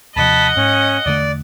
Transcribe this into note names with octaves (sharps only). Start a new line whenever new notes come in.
D#2 C3 F3 D#5 F#5 A5 B5
G#2 C#4
E2 D3 A3 D5